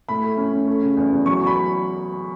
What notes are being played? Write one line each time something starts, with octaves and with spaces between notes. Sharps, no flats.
A2 B5
A3
C#4
C#4
A3
C#3
E2
E2
F#3 C#6
E2
B5